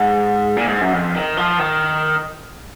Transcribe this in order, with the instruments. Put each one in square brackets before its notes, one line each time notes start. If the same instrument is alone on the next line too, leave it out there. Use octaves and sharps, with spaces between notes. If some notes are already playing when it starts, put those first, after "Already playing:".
Already playing: [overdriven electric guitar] G#2
A#2
G#2
F#2
F2
D#3
F3
D#3